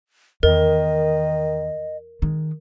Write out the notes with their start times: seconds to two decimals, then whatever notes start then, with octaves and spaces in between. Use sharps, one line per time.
0.43 E2 D#3 A#4 D#5
2.22 D#3 G#3